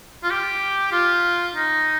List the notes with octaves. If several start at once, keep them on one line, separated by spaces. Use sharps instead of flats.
F4
G4
F4
D#4